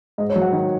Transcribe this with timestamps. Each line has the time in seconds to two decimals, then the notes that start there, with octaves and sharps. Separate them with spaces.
0.18 G#2 D#5
0.30 C#5
0.36 F#3
0.42 F#5
0.53 D#3